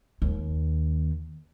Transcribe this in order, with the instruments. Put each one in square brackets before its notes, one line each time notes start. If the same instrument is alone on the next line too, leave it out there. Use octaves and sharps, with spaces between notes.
[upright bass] D#2